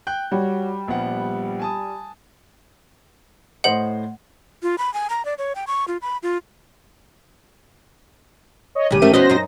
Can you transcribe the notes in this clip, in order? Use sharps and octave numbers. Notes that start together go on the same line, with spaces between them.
G5 F#6 G6
G3 F#4 C#5
A#1 B3 F#5
G#5 A5 D#6
A2 C5 D#5 F#5 F#7
F4
B5
G#5
A#5
D5
C#5
G5
C#6
F4
B5
F4
C#5 D#5
A1 G2 C#3 G4 D#7
F3 A3 C#4 A#4 E5
E2 B3 C#4 F#4 C5 D#5 A#6
F#2 D#4